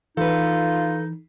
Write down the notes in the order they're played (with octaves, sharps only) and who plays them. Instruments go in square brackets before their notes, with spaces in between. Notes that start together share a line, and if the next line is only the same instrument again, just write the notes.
[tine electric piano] E3 [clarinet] D#4 [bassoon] F4 [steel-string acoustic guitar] A4 B4